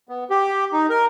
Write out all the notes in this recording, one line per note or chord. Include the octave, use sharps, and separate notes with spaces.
B3
G4
D#4
A#4